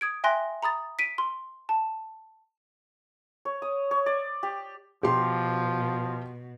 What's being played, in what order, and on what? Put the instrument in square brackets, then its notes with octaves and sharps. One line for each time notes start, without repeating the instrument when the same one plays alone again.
[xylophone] D#6 G#6 D7
E5 G5 G#5 C6 F#6 A#6
A#5 B5 D#6 A6
B6 D7 D#7
C6
A5
[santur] C#5
D#6
C#5
D5
G4
[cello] B2 [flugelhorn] F3 [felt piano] G4 C6